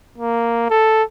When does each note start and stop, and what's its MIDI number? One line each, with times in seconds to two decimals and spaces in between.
0.18 0.67 58
0.70 1.03 69